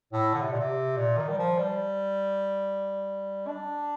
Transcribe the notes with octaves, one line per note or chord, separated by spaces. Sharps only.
A2
D3
C3
A#2
C3
A#2
D#3
G3
F3
G3
D4